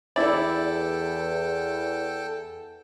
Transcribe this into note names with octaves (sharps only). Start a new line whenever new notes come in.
E2 E4 A4 D5 G5